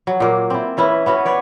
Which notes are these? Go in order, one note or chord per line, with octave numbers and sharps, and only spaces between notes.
F#3
A#2 A#3
C4 E4
E3 C#4 E4 B4
B3 C#4 F#4 B4
B4 C#5 D5